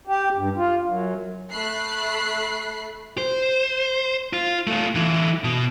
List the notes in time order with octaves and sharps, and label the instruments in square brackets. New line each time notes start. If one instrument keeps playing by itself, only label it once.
[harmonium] G4
G2
F4
F#2
[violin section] A3 B5 F#6 C7
[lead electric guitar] C5
F4
A3 F4
D3 E3
B2